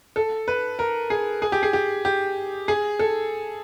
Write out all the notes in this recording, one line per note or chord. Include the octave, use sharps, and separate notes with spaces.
A4
B4
A#4
G#4
G#4
G4
G#4
G4
G4
G#4
A4